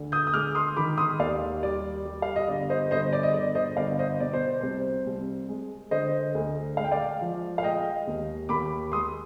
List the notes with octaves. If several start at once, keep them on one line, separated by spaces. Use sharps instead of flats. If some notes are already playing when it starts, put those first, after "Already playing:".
Already playing: D2 D3
D#6 G6
D#6
G#3 D6 F6
C6 D#6
D#3 B5 D6
C6 D#6
D#2 D5 F5
G3 D5
G3
F5
D#5
G1 D5
C5 D#5
G1 C5 D#5
D5
D#5
G1 D5
C5 D#5
G1 D5 F5
C5 D#5
B2 D5
C5
C2 C5
C2
G#3
D3 C5 D#5
D2
G#3 F5
G5
D5 F5
F3
F5
G#3 D#5 G5
D#2
D#2 B5 D6
G#3 C6 D#6